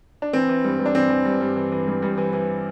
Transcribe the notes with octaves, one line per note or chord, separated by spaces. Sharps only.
D4
E3 C4
E3
G2
G2
D4
E3 C4
E3
G2
G2
E3
E3
G2
G2
E3
E3